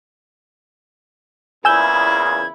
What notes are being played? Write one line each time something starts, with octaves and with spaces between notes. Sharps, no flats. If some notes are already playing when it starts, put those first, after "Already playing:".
E2 A#2 C#3 E4 G#5 E6 G6 G#6